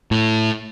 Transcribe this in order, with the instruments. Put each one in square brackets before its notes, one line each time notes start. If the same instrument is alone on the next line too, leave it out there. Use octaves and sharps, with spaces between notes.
[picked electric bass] A2